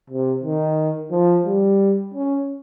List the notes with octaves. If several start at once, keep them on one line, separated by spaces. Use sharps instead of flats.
C3
D#3
F3
G3
C#4